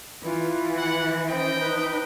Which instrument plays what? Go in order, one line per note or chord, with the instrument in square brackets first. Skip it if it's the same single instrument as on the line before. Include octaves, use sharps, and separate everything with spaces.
[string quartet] E3 [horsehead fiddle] F4 [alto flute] B4
[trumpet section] F#5
[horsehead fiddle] C#4 [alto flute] C5 [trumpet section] D#5 G5
[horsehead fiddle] D#4 B4